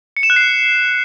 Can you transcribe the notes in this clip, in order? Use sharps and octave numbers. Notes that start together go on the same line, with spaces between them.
C#7
E7
F#6
C7